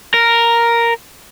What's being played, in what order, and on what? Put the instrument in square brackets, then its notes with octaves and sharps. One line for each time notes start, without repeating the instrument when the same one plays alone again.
[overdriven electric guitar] A#4